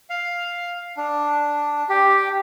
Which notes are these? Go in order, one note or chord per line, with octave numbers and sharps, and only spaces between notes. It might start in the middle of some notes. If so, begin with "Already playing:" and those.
F5
D4
G4